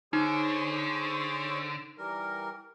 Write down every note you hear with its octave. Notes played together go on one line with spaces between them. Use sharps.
D3 D#4 G#4 C5 C#5
E3 G3 A#4